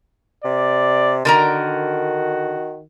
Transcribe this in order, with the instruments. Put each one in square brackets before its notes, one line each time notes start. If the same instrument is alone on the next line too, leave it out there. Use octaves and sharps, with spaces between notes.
[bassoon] C3 [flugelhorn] D5
[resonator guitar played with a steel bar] D3 A#4 A#5 [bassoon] D#3 [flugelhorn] F#4